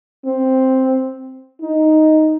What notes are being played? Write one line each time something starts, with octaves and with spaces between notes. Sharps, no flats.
C4
D#4